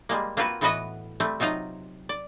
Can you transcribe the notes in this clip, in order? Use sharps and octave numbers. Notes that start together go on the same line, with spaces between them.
G3 G#3 A#3
A#3 C4 F4 F#4 B4
A2 E3 B3 F#4 B4 D#5
G3 A3 C4
C3 F#3 D#4 F4 A#5
D5